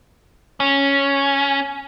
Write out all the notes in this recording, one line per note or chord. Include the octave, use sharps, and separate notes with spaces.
C#4